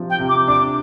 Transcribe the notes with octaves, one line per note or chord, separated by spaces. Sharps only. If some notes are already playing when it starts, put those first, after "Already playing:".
Already playing: C3 F3 D4
G5
C3
D6
D4 D6